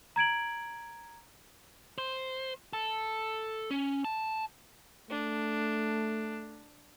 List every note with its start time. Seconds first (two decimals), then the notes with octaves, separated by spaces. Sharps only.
0.16 A#5 G#6 D7 F#7
1.98 C5
2.73 A4
3.71 C#4
4.04 A5
5.10 A3 D4